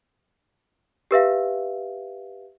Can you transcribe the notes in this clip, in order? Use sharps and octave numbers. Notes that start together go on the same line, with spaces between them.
G4 B4 E5 F5